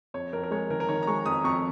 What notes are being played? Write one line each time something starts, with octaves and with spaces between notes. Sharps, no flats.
F2 C#5
F2 A#4
A#4
G#3 C#5
D#3 A#4
A#4
D#3 C#5
A#5
G#3 C#6
F2 D#6
F2 C#6